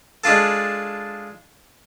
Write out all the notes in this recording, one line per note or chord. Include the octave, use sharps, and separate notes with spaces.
G#3 D4 F4 A4